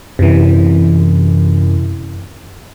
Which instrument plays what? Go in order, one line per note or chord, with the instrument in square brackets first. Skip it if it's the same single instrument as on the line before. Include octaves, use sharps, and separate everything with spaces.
[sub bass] F#2 [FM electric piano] C3 E3